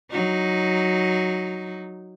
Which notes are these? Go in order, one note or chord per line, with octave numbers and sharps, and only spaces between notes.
F#3 D#4